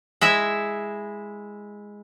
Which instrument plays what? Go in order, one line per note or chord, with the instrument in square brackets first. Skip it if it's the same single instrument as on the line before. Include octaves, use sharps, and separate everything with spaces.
[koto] G#3 E4 E5